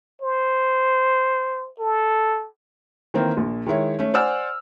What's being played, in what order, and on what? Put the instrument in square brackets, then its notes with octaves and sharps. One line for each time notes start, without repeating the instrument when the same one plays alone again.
[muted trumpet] C5
A4
[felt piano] D#3 E3 A#3 C4
A#1 A#2
D#3 G#3 E4 C#5
A3 C#4
C5 D5 F#5 G#5 E6 F6